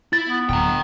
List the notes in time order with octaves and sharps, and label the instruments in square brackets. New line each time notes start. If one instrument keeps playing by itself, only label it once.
[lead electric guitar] E4 [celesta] A6
[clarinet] B3
[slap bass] D1 [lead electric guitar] G5 A#5